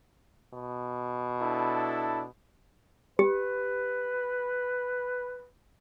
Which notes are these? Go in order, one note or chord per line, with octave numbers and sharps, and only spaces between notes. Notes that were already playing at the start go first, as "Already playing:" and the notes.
B2
D4 E4 A4
G4 B4